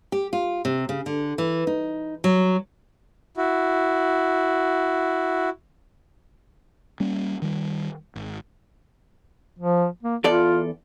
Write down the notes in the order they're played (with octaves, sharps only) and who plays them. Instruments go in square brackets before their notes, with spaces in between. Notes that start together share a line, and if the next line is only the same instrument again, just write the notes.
[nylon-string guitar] G4
F4
C3
C#3
D3
E3
D#4
F#3
[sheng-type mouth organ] E4 F#4
[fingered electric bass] G3 A#3 C#4
D#3 G3
G#1
[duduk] F3
A#3
[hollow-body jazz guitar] E2 A4 D5 [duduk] F4